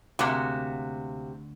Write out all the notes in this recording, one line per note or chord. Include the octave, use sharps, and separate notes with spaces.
D2 C3 G#3 A#3 F#4 F#5